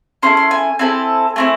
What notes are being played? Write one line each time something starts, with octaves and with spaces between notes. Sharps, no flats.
C#4 E4 A4 C6
C6
G#5
C4 E4 A4 G#5
A3 C4 E4 G#5